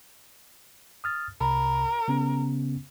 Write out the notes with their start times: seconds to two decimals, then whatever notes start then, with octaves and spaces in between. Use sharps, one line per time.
1.04 D#6 F6 A6
1.41 C2 C3 A#4 B5
2.08 C#3 B3 C#4